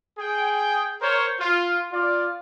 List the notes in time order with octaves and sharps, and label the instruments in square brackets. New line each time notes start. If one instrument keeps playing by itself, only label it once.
[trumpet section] G#4 G5
A#4 C5 C#5
F4
F4 D5